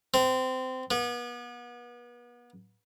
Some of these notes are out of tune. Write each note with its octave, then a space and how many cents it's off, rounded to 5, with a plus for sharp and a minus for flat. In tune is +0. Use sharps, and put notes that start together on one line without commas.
C4 -20
B3 -35